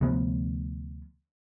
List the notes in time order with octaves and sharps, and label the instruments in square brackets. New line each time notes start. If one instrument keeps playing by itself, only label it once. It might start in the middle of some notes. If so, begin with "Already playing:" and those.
[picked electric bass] D2 C3 F3 B3